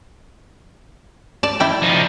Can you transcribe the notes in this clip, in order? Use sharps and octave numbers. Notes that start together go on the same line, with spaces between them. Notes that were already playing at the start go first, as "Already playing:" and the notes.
D5 A5
E4 D5 G5
F3 D#4